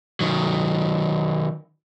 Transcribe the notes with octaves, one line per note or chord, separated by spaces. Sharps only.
D#3 F#3